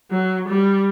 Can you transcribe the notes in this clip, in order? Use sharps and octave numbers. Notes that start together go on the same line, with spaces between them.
F#3
G3